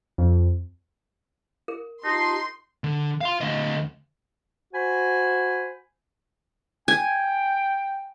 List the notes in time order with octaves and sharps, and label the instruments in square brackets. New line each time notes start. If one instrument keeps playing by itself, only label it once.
[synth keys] F2
[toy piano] A#4
[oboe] D#4 [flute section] F4 G4 A5 [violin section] C6
[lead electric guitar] D3
F5 C6
D2 D#5
[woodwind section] F#4 C5 G#5 B5
[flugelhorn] G5 [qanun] G#5